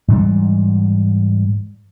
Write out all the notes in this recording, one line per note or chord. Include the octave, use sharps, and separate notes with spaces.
G#2 E3 G3